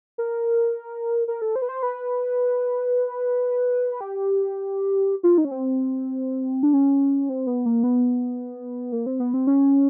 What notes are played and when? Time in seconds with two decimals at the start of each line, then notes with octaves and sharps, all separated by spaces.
0.18 A#4
1.28 A#4
1.42 A4
1.56 C5
1.62 B4
1.69 C5
1.83 B4
4.01 G4
5.23 F4
5.38 D#4
5.45 C#4
5.51 C4
6.63 D4
6.73 C#4
7.29 C4
7.47 B3
7.66 A#3
7.83 B3
8.92 A#3
9.06 C4
9.20 B3
9.34 C4
9.47 C#4